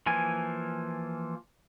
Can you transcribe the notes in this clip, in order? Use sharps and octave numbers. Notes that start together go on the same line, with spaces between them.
E3 F3 A#3 G#5